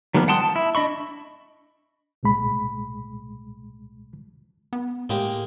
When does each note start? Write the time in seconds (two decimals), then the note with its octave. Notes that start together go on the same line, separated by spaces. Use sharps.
0.14 D#3 F3 G3 A#3 B3
0.28 F#5 G5 A5 C6 D#6
0.40 A5
0.56 E4
0.75 D4 D#5 B5 C#6
2.23 C2 A#2 G#3 B5
4.73 B3
5.10 A2 G#3 A#3 G4